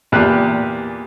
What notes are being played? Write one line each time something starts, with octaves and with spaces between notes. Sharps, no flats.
E2 A#2 G4 F#6